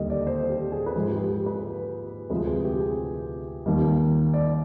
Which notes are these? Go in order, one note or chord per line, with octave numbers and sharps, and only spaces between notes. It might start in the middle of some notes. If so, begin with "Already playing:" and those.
Already playing: D#2 D3 G3 D#5
D5
C5
G4
G#4
B4
G#2 F3 G#3 G#4
G4
G4
B4
D2 C3 F3 G#3 B4
G#4
G4
G#4
D#2 D#3 G3
D5